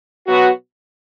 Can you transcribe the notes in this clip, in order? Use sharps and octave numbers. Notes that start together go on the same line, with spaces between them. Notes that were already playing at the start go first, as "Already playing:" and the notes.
B2 F#3 B3 F#4